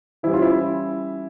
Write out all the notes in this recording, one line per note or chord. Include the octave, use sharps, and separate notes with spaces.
E3 G3 C#4 E4
F4
E4